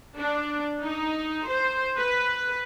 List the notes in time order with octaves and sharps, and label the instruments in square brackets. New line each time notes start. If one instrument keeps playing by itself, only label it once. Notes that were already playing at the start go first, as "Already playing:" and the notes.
[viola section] D4
D#4
C5
B4